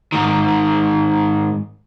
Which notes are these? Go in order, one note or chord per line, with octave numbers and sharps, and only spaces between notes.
G#2 D#3